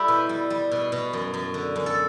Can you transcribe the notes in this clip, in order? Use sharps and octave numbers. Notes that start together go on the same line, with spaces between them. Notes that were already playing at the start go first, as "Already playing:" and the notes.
Already playing: G3 E4 G4 A4
B2
G3
G3
B2
B2
F#2
F#2
D3
F#2
A4